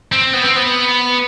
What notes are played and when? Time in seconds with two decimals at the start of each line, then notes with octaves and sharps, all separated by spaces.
0.12 C4
0.33 B3
0.44 C4
0.56 B3